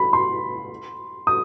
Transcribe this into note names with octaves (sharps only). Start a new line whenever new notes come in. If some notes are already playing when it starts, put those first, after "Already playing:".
Already playing: B5
C6
D#6